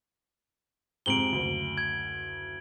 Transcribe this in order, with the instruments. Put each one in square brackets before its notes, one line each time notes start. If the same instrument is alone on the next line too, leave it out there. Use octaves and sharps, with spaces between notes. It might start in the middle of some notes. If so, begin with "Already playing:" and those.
[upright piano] F2 G#2 C3 [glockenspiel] D7 F#7 G7
[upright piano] F#1 D2
[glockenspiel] G#6